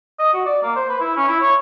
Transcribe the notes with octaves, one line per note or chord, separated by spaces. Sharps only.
D#5
F#4
D5
A#3
C5
B4
E4
C#4
E4
C#5